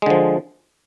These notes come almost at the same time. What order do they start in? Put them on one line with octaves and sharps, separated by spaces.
G#3 D3 F3